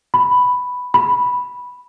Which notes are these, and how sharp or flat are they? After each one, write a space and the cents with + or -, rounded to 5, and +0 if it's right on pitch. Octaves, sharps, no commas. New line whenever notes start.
B5 +5
B5 -5